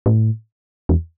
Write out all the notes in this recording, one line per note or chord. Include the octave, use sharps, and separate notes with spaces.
A2
E2